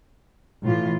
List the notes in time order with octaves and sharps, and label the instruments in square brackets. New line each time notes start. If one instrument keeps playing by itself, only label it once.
[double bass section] A2 [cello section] E3 F4